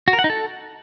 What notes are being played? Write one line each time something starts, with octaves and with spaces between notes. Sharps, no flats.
F#4
A#4
F#5
D#4
A4